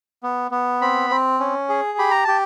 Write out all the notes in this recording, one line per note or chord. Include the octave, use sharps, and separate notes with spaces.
B3
B3
C4 B5
C4
C#4
G#4
G4 B5
A#5
G4 A5